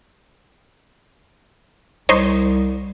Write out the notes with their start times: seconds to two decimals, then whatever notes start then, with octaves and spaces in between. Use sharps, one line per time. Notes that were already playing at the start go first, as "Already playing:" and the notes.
2.09 C2 D#4 C5 C#5